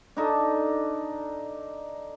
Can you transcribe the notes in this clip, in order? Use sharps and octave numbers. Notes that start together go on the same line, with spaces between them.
D4 D#4 A4